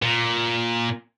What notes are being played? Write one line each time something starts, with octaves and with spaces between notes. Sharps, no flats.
A#2